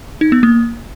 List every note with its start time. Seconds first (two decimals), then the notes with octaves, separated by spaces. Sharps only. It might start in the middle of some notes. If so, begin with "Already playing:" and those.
0.21 D#4
0.32 B3
0.43 A#3